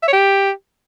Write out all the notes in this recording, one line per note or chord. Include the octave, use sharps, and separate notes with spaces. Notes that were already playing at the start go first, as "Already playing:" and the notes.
E5
C#5
G4